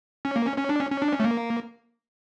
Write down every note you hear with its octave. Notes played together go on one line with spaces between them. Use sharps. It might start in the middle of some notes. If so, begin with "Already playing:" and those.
C#4
A#3
C#4
C#4
D4
C#4
C#4
D4
C#4
A3
A#3